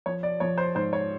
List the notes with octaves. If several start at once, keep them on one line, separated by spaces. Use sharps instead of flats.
F3 C#5
D5
F3 C#5
C5
G#2 C5
C#5